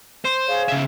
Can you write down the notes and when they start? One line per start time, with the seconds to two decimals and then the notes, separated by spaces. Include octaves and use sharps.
0.25 C5
0.47 G#4 C#5 F5
0.68 C#3 E5